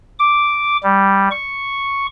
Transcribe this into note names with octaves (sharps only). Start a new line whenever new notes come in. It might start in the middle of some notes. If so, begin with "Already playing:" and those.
D6
G3
C#6